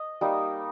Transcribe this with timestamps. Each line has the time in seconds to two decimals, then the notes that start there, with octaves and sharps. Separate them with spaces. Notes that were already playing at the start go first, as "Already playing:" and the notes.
Already playing: D#5
0.21 G3 A#3 D#4